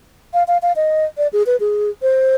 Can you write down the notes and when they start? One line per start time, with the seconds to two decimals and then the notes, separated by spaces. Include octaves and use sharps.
0.34 F5
0.48 F5
0.62 F5
0.76 D#5
1.18 D5
1.33 G#4
1.46 B4
1.60 G#4
2.02 C5